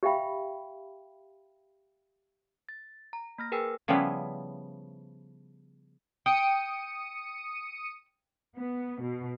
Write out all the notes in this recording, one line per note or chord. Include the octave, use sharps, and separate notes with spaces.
G4 E5 F5 G5 B5
A6
A#5
A#3 F6 A#6
G#4 A#4 B4 G5 G#5 E6
C#3 F3 G3 B3 C#4 E4
G5 D#6 C#7 D#7
B3
B2